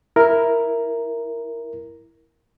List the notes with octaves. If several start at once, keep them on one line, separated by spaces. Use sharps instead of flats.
E4 A#4